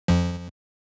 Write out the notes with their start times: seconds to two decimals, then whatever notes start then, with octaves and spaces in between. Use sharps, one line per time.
0.08 F2 F3